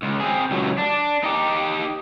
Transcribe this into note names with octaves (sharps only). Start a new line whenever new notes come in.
C#2
C4 G#4
C#2 F#3
D4
D#4 G4